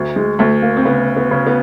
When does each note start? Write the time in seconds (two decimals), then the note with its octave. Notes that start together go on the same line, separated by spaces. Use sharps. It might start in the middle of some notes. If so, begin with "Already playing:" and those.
Already playing: D2
0.16 G#3
0.39 D2 A3
0.62 A#3
0.77 C4
0.85 C#3 B3
1.16 B3
1.31 C#3
1.46 B3